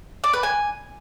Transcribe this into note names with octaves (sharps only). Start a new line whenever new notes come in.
D5
B4
G#5